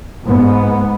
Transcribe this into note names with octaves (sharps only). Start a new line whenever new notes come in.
G#2 B3